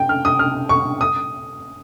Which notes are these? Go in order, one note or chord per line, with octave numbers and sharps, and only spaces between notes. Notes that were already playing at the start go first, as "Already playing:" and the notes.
Already playing: G5
F6
D#6
F6
C#6
D#6